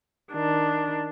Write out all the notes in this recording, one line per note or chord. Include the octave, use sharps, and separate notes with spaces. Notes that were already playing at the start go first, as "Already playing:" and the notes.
D#3 D4